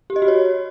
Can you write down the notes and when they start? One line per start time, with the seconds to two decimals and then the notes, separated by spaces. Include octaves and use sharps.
0.10 G4
0.16 D#5
0.22 F#4
0.28 C#5